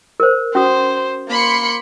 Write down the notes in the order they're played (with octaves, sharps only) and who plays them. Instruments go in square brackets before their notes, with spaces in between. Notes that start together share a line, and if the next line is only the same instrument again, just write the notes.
[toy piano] A#4 C5
[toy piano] C#4 F#4 D#6 [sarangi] C5
[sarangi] A#3 [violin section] B5 C6 C#7